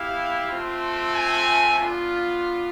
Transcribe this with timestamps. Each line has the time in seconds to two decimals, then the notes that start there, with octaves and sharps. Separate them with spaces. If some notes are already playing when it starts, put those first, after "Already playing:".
Already playing: B3 E4 G4 F5
0.49 A3 C4 F4
1.14 G#5
1.78 B3 D4 F4